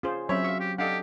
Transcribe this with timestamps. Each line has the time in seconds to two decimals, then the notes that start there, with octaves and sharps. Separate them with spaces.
0.03 C#4 F4 G#4 C5
0.29 F#3 C4 C#4 C5 C#5 E5 B5
0.44 F5 C#6 E6
0.60 G4
0.78 D4 G4 A4 D#5 F5 F#5